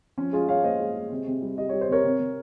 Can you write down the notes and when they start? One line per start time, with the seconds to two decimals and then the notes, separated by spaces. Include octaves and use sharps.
0.18 F3 C#4
0.32 G#3 F4 G#4
0.48 G#3 C#5 F5
0.64 A#2 C5 D#5
0.80 G#3
0.95 G#3
1.11 C3
1.27 C3
1.42 G3
1.58 G3 D#5
1.69 G3 C#5
1.81 C5
1.89 C3 A#4 C#5
2.04 C3
2.20 C3